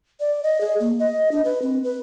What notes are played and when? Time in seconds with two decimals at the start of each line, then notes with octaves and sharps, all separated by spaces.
0.20 D5
0.43 D#5
0.61 G#4
0.80 A#3
0.99 D#5
1.31 D4
1.45 B4
1.62 C4
1.84 B4